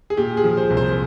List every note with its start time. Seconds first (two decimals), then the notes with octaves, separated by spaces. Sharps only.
0.10 G#4
0.17 A#2 G4
0.37 G#4
0.44 F3
0.57 C5
0.70 C2
0.77 C5